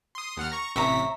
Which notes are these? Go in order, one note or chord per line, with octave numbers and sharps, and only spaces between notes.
C6 D#6
D#2 F#5 F6
A#5 C#6
A1 C3 C#5 E5 A#5 B6